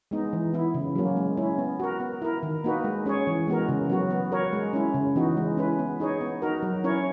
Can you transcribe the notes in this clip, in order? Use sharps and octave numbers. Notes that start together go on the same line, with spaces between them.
G#3 B3 D#4
E3
B3 E4
C#3
F#3 A#3 C#4
G#3
C#4 E4
B3
F#4 A#4
B3
E4 A#4
D#3
A#3 D#4 F#4 B4
G#3
C#4 G#4 C#5
E3
G#3 B3 F#4 A#4
C#3
F#3 B3 F#4
B3
F#4 A#4 C#5
G#3
C#4 E4
C#3
E3 B3 D#4 F#4
G#3
C#4 E4 B4
B3
D#4 G#4 C#5
B3
D#4 F#4 A#4
F#3
C#4 E4 A#4 C#5